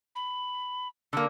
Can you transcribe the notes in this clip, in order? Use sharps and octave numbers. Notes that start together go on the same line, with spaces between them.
B5
D3 A#3 E6